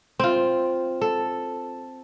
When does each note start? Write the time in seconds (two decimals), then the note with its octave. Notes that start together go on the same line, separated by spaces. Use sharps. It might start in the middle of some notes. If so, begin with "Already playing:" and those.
0.19 C4 F4
1.01 A4